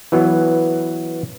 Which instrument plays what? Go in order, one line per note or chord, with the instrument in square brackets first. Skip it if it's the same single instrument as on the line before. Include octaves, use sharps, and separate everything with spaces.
[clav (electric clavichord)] E3 F#3 B3